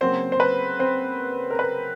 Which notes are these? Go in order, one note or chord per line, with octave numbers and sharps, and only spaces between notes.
C#3 F#3 A#3 C4 C5
C5
B4
C4 C5
A#4
B4